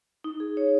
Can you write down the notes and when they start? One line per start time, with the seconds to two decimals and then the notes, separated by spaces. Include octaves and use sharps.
0.24 D#4
0.40 G#4
0.57 C#5